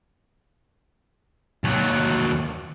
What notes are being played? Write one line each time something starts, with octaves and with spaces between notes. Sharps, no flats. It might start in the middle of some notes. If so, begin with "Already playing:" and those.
D#2 F#3